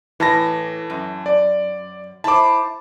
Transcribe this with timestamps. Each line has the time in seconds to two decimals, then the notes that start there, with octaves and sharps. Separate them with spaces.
0.20 A2 E3 A5 A#6
0.90 F#2
1.26 D5
2.24 E4 C5 A5 D6